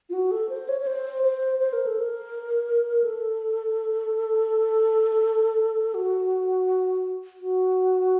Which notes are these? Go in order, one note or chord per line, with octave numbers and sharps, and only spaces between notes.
F4
F#4
A4
C5
C#5
C#5
C5
C5
C5
A#4
A4
A#4
A4
F#4
F#4